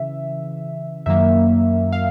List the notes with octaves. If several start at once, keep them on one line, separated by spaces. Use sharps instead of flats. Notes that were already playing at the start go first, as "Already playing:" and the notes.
Already playing: C#3 E3 E5
F#2 D#3 F#3 A#3 E5
F5